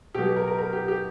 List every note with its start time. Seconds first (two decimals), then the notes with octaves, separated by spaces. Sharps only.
0.14 B2 G4
0.18 F#3
0.26 G4
0.36 A#4
0.48 A#4
0.58 A#4
0.73 G4
0.88 G4